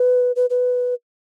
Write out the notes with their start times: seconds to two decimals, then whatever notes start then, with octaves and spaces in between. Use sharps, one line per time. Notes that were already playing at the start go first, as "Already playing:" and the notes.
Already playing: B4
0.36 B4
0.50 B4